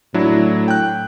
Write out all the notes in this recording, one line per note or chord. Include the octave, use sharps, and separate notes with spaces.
A2 F#3 D4 E4
G5 F#6